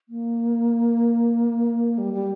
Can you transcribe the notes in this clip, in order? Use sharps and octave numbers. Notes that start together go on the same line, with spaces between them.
A#3
G3
G3